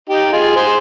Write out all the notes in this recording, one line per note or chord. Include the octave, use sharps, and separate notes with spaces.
D#4 G4
F4 G#4
G#4 C5